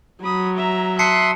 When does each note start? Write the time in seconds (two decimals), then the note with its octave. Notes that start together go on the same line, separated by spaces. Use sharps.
0.24 F#3 B5 D#6
0.57 E5 A#5
0.99 E5 A5 C6 D#6 F#6 C7 C#7